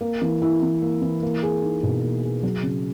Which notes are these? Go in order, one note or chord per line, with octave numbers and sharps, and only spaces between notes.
A#3
E3
E4
E3
A#3
E3
A#3
G#4
D#4
B2
A#3
G#4
F#3
C#3